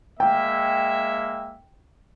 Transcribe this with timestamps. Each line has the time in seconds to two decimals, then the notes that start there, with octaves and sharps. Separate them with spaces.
0.20 G#3 A#3 E5 G5